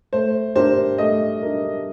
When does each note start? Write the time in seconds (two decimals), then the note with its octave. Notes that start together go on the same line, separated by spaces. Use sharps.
0.13 A3 C5
0.56 D4 G4 A#4 C5
0.98 A3 D#5
1.42 D4 G4 A#4